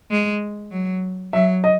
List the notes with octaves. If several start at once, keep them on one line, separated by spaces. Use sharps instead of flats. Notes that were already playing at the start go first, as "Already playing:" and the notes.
G#3
F#3
F#3 E5
D#5